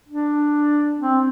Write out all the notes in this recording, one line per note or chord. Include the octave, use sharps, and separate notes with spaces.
D4
C4